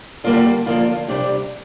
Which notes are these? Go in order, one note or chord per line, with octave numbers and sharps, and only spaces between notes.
D3 G3 A#3 F4 D5
D3 F3 A#3 F4
C3 G3 D4 G4 D5